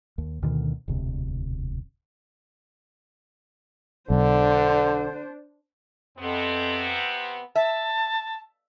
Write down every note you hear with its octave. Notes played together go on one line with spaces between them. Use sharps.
D#2
D2 B2 D3 D#3
E1 D2 C3
B1 D3 D4 C5
F2 C3 B3 C4
E5 A5